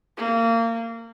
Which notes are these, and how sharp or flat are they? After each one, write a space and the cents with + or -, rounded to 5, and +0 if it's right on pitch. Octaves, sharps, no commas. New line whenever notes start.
A#3 -25